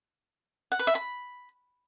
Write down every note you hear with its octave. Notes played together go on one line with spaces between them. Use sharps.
F#5
B4
E5
B5